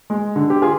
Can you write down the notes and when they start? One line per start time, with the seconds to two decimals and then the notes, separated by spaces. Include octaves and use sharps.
0.10 G#3
0.36 D3
0.50 G4
0.62 F4 G#4